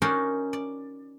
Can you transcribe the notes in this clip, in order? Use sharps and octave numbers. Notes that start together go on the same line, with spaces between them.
C#4 D#4 F#4 A#4 C5 D5
D5